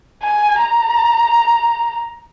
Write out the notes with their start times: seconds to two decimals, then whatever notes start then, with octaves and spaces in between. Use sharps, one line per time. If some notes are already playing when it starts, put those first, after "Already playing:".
0.23 G#5
0.60 A#5